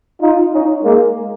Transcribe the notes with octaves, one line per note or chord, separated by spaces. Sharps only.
D#4 F4
C#4 D#4
G#3 A#3